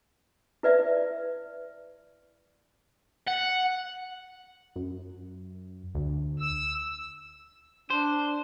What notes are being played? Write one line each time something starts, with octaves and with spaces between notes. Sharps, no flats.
E4 B4 D5 E5
F#5
F#2
D2
E6
D4 C5